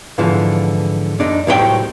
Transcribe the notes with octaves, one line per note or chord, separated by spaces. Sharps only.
G#2 D3 E3 F3
F#2 D4 D#4
C2 A2 F#3 C4 B4 G5